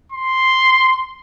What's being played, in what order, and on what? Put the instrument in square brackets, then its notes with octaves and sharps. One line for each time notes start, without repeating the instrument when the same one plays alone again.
[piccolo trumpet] C6